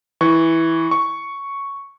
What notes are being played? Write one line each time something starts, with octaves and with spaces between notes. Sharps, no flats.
E3 C#6
C#6